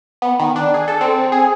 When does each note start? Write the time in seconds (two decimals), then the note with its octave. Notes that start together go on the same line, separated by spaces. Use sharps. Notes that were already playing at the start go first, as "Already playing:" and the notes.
0.22 B3
0.40 D#3
0.56 D4
0.74 G#4
0.88 A4
1.01 C4
1.32 G#4